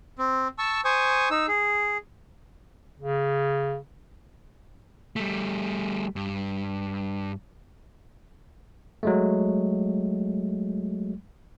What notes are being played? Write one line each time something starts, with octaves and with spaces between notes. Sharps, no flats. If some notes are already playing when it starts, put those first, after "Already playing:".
C4
A5 C#6 E6
C5 G#5 C#6 D#6
D#4 E6
G#4
C#3
G3 A3
G2
F#3 G#3 A3